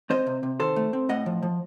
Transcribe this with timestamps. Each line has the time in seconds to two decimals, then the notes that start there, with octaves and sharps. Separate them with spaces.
0.10 C4 C5 D#5
0.27 C3
0.43 C3
0.60 D#3 A4 C5
0.76 A3
0.93 C4
1.09 A2 D#5 F#5
1.26 F3
1.43 F3